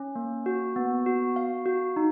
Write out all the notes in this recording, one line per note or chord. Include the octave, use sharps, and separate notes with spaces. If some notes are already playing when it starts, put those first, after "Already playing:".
Already playing: C#4
A#3
F#4
B3
F#4
F5
F#4
D#4